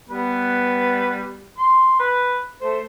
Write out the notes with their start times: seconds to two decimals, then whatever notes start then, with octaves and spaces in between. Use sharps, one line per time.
0.09 G3 B3 B4
1.58 C6
1.99 B4
2.61 A3 C5